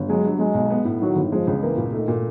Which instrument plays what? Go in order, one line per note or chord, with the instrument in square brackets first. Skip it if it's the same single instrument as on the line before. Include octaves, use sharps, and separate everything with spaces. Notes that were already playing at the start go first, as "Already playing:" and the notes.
Already playing: [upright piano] G1
[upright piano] F#3 [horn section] G#3
[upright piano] G2
[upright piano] F#3 [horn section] G#3
[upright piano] B1
B3
A2
[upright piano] D#3 [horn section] F#3
[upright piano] G1
[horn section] F3 [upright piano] G#3
[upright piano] C#2
[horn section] E3 [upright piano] A#3
[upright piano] A#2
[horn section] D#3 [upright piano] A3
[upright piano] A#2